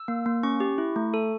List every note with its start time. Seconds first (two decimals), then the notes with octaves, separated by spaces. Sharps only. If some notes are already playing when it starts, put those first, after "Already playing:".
Already playing: E6
0.08 A#3
0.26 A#3
0.43 C#4 C#6
0.60 G4
0.78 E4
0.96 A3
1.14 A4